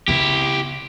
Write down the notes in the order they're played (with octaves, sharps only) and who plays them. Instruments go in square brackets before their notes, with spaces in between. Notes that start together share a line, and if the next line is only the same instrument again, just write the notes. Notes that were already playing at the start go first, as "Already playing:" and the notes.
[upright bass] C#3 B3 [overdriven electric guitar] E4 G4